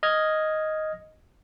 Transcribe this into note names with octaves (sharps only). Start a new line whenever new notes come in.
D#5 F6 G#6